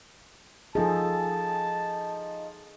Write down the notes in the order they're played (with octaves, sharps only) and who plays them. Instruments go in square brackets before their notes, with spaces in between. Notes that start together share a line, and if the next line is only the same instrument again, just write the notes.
[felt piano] F3 D#4 [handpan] G#4 A4 [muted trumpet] A5